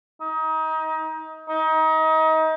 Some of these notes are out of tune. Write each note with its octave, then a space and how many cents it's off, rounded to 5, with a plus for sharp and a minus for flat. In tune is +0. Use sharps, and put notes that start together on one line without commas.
D#4 +25
D#4 +30